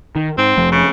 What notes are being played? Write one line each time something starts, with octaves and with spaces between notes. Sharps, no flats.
D#3
G#2 C4
F1 F3 A3
C#3